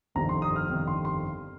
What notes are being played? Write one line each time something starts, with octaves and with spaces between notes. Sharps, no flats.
G1 F2 C3 D#3 G3 A#5
C6
D#6
F6
G1 F2 C3 D#3 G3
C6
C6